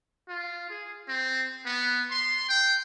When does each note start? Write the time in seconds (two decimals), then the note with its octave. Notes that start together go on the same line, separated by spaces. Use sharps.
0.28 F4
0.70 G#4
1.08 C4
1.65 B3
2.11 C6
2.49 G5